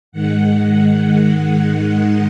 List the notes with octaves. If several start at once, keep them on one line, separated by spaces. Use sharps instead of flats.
G#2 D#3 G#3 F#5